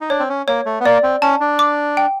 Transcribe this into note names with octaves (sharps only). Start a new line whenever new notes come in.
D#4
D4 C#5
C4
C#4
A#3 C#5
A3
B3
A#3 D5
C4
C#4 A5
D4
D6
G5